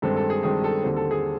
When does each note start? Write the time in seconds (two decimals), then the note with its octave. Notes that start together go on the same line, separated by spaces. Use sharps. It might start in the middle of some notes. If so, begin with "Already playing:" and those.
0.02 G2 D#3 G#3 C4 A4
0.16 A4
0.30 G#4
0.43 G2 D#3 G#3 C4 G#4
0.64 A4
0.83 D#2 D3 G3 C4
0.96 A4
1.11 G#4